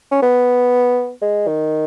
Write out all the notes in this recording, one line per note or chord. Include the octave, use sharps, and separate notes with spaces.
C#4
B3
G#3
D#3